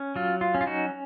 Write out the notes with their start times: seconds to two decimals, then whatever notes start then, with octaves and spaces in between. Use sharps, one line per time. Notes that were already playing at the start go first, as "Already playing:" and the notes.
Already playing: C#4
0.16 F#3 F4
0.41 F4
0.55 C#4
0.61 F4
0.67 D#4 F#4